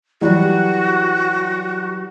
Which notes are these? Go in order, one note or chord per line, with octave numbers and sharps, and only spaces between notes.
E3 F#3 G3 F#4